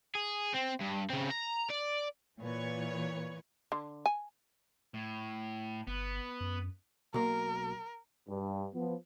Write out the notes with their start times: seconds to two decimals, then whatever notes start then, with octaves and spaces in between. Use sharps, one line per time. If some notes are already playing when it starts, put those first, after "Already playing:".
0.15 G#4
0.54 C4
0.81 G2
1.10 C#3 C4
1.31 A#5
1.70 D5
2.40 A#2 E3 B4 C#5
3.72 D3
4.06 G#5
4.94 A2
5.87 G1 B3
6.40 F#2
7.14 B1 A#3 A#4
8.28 G2
8.74 F3 B3